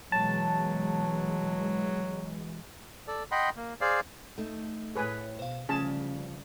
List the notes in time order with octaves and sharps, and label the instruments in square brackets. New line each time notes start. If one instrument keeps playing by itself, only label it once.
[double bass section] B2 E3 G#3 [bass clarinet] F#3 [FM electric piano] A5
[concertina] A4 D5
D#5 F#5 G5 B5 C6
A#3
G#4 C5 D5 F5
[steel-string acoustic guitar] A3 D#4
[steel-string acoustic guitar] A2 C#5 [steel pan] G#4 B4 G#5
[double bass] B2 [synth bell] C5 F5
[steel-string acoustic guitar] D2 F3 [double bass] C#3 G3 [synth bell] C#4 [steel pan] G#4 A5